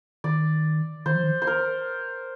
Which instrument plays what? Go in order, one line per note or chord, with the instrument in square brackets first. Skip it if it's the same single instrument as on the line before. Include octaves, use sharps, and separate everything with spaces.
[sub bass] D#3 [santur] D5
[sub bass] D#3 [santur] C5
[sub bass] F3
D#3
[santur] C5
A#4